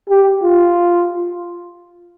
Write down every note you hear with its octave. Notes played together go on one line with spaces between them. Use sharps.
G4
F4